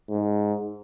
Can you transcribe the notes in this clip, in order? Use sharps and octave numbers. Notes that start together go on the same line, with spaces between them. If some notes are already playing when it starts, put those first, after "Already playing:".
G#2